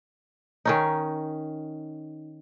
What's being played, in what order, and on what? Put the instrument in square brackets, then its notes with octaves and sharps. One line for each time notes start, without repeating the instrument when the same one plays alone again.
[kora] D#3 C#4 D#4